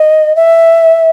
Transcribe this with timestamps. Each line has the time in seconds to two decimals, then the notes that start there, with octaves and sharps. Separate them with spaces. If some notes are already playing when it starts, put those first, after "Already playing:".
Already playing: D#5
0.36 E5